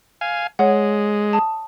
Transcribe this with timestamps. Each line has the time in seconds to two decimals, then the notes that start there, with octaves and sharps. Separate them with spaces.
0.21 F5 G#5
0.59 G#3 C#5 F#5
1.33 A5 D#6